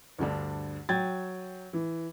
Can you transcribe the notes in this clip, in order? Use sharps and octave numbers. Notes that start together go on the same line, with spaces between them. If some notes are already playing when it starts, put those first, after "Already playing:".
D2 G2 D3 D4
F#3 G5 G#6 A6
E3